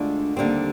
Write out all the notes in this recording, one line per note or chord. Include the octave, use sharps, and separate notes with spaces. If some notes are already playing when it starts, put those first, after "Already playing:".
Already playing: D2 D3 G#3 D4 F4
D#2 D3 G3 C4